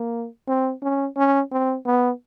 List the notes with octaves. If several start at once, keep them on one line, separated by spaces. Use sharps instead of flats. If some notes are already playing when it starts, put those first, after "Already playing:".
Already playing: A#3
C4
C#4
C#4
C4
B3